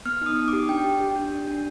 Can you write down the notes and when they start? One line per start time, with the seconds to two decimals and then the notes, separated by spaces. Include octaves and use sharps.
0.05 B3 F6
0.22 D#4 D#6
0.37 D#4
0.48 D6
0.53 G4
0.69 D4 G5
0.84 G4
1.01 G4
1.16 D4
1.32 D4
1.48 D4